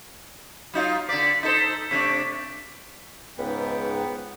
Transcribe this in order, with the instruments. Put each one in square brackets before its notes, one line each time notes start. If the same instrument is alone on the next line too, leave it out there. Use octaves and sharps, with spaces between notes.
[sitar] F#3 D#4 F4
[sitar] D3 D5 [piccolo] B6
[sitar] D#4 A4 C5
[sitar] C3 A3 D4 [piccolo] B6
[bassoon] C#2 [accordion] G#2 [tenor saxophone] B3 [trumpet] G5